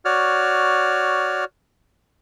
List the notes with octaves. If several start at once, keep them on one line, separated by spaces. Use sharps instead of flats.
F#4 C#5 D5 F6